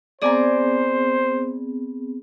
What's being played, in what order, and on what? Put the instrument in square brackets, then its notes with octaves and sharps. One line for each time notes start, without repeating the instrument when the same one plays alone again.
[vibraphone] B3 C4 G#4 [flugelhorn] C5 [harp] D5 G#5 A#5